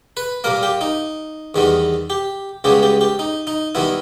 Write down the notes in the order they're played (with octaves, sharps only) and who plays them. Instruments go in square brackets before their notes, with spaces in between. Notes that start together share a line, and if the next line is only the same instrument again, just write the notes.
[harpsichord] B4
A#2 G3 A#3 A#4
G4
D#4
E2 D#3 G3 B3
G4
C#2 C#3 G3 B3 G4
G4
G4
D#4
D#4
D#3 G3 B3 E4